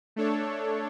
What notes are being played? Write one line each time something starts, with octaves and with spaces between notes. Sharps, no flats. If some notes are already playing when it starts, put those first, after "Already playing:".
A3 D4 A4 C#5